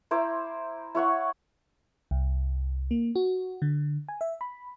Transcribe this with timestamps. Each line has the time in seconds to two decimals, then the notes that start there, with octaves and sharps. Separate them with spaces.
0.11 E4 C5 A#5 D6
0.95 E4 C#5 F#5 C#6
2.11 C2
2.91 A#3
3.16 F#4
3.62 D3
4.09 G#5
4.21 E5
4.41 B5